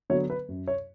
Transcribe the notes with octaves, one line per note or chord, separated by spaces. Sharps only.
D3 F#3 B3 C#5
B4
F#2
C#5